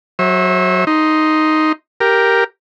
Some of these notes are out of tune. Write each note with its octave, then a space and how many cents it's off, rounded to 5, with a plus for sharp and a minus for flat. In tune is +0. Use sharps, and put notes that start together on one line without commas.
F#3 +0 C5 +45 E5 -20
D#4 +0 C6 +0
G4 +0 A#4 +5